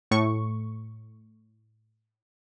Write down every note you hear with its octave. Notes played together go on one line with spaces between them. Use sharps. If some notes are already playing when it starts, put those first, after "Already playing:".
A2 C#6